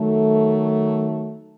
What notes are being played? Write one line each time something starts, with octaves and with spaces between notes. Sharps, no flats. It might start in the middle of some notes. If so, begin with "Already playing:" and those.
Already playing: D#3 F#3 A3